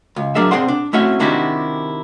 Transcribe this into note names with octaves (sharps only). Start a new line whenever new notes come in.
C#2
F#3 D4 G#4 A#4 E5
C3 C4 G#4 D5 F#5 C6
D4
A3 C4 C#4 E4 F#4 E5
C3 D#3 D4 E4 F#4 G4